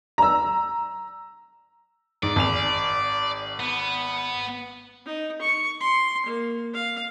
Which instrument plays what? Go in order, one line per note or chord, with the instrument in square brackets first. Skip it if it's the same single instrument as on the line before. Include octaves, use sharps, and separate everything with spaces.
[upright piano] A#5 E6
[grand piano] G#2 [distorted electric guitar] D5
[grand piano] G#1 G#5 F7
[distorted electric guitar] B3
[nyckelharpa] D#4
C#6
C6
A#3
F5